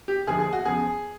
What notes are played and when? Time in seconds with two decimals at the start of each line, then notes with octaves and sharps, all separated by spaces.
0.08 G4
0.27 D#2 D3 F3 G#4
0.40 G#4
0.53 F#4
0.65 E2 C#3 F3 G#4